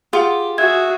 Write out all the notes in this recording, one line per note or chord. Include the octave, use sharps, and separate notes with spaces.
F4 G4 G#4 F#5
F#4 G#4 E5 G#6